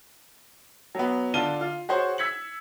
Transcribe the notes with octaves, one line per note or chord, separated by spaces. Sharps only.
F#3 B3
D3 D4 F4 A5 D#7 G7
F4
F#4 G#4 C5 C#5
E6 G#6 B6 C#7 F#7